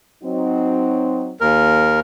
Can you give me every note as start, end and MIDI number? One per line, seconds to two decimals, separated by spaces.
0.24 1.33 54
0.24 1.33 60
0.24 1.33 63
1.41 2.00 39
1.41 2.00 70